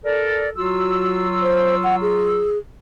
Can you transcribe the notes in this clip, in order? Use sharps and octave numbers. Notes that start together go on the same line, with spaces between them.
A4 A#4 D5
F#3 F4 F#4 E6
C5
F#5
G#4